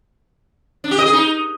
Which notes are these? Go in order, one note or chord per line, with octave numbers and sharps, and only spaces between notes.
D4
G4
D#5
G#4
D#4